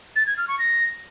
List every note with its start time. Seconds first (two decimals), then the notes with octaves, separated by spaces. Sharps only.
0.16 A6
0.27 G#6
0.37 F6
0.48 C#6
0.59 A#6